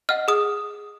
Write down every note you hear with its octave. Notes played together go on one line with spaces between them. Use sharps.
D#5 F#5 F6
G#4 D#6